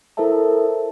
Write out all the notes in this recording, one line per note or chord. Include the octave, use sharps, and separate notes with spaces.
E4 A4 A#4 C5 E5 A5